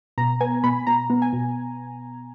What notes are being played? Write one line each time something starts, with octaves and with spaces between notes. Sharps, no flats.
B2 A#5
B3 G#5
B2 B5
B2 A#5
B3
G#5
B2